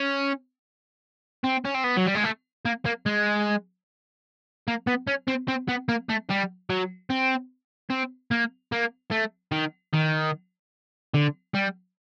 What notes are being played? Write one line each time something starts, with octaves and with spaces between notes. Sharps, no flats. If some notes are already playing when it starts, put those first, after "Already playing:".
Already playing: C#4
C4
C#4
C4
B3
F#3
G3
G#3
A3
A#3
A#3
G#3
A#3
B3
C#4
C4
C4
B3
A#3
A3
G3
F#3
C4
C4
A#3
A#3
A3
D#3
D#3
D3
G3